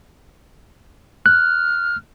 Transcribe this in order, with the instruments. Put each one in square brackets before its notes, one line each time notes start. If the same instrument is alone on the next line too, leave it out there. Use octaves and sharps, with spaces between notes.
[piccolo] F6 [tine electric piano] F#6